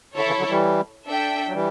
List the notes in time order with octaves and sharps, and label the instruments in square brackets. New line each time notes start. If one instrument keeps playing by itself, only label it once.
[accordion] D3 [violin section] E4 A4 C#5
[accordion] C#3 E3
D3 F#3
E3 G3
[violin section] D4 A4 E5 G5
[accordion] F#3
E3 G3